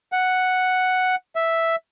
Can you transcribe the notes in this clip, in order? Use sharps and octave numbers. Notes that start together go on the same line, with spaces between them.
F#5
E5